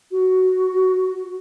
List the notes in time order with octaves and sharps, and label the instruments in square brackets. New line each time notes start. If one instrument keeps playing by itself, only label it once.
[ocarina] F#4